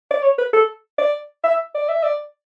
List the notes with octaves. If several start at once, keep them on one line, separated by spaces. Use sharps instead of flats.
D5
C#5
B4
A4
D5
E5
D5
E5
D5